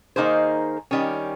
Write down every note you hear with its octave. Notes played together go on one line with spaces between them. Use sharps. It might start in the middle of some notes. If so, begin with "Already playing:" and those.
D#3 A#3 D#4 G#4 C5
D#3 G3 C#4